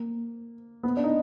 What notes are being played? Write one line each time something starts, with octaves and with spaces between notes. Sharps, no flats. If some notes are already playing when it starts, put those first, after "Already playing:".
Already playing: A#3
B3
D4
D#4